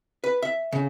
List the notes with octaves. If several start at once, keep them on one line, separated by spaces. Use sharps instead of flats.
B4
E5
C#3